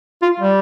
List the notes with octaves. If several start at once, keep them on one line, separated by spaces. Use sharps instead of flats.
F4
G3